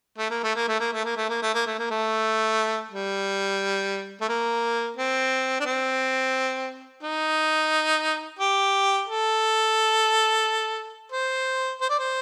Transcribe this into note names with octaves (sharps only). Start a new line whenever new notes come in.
A3
A#3
A3
A#3
A3
A#3
A3
A#3
A3
A#3
A3
A#3
A3
A#3
A3
G3
A3
A#3
C4
D4
C4
D#4
G4
A4
C5
C5
D5
C5